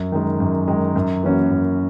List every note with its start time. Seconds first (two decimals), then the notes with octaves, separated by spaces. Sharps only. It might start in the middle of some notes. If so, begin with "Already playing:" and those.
Already playing: F#2
0.12 D#3 G#3
0.40 F#2
0.68 D#3 G#3
0.96 F#2
1.23 E3 A#3 C#4 F#4
1.51 F#2